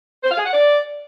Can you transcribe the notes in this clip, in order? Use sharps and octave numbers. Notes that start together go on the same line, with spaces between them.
C5
F5
G#4
F#5
D5